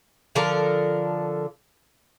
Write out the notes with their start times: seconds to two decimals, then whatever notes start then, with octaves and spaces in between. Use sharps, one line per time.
0.35 D3 F3 A4 A#4